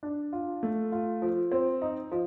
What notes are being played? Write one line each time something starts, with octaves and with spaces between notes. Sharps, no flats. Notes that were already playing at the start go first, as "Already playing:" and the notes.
D4
F4
A3
F4
F3
C4
D#4
F3